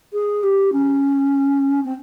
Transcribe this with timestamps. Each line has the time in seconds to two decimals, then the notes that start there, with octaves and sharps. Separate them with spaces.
0.13 G#4
0.43 G4
0.73 C#4
1.85 C4